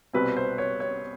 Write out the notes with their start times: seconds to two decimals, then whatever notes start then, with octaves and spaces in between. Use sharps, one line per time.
0.13 C2 B2 G3 C4 B4
0.37 C5
0.58 C#5
0.80 C#5